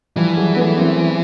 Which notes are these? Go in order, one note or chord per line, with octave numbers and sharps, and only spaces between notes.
E3 F3 G3
F#3 G#3
A3 B3
A#3 C4